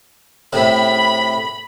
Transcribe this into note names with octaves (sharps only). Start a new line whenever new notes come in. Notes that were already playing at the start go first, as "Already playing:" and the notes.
A2 C3 E4 B5